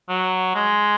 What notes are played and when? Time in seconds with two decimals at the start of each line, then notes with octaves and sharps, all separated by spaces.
0.09 F#3
0.55 G#3